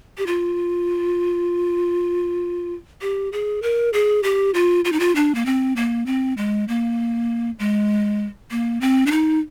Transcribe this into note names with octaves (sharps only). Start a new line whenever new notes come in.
G4
F4
G4
G#4
A#4
G#4
G4
F4
F4
D#4
F4
D4
A#3
C4
A#3
C4
G#3
A#3
G#3
A#3
C4
D4
D#4